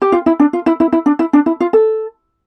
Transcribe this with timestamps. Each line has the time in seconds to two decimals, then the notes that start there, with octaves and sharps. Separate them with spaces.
0.02 G4
0.12 F4
0.26 E4
0.40 D4
0.53 F4
0.66 E4
0.80 E4
0.93 E4
1.06 D4
1.19 E4
1.33 D4
1.46 E4
1.60 F4
1.73 A4